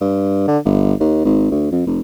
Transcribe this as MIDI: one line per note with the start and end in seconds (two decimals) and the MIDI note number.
0.01 0.47 43
0.48 0.58 50
0.65 0.94 31
1.00 1.21 39
1.25 1.50 32
1.51 1.69 38
1.72 1.83 41
1.87 2.01 29